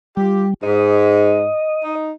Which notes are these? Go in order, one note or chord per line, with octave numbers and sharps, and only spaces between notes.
G3 F4 G4
G#2 D#5
D#4